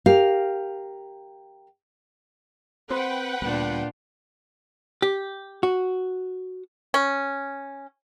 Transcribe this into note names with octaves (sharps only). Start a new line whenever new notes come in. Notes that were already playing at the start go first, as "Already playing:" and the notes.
G4 A#4 F5
C4 B4 C5 F#5 G5
D2 A#2 G3 B3 D4 F4
G4
F#4
C#4